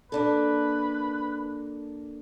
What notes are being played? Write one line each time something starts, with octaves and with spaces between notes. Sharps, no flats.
A#3 D4 A4 B4